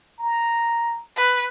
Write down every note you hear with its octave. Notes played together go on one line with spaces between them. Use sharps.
A#5
B4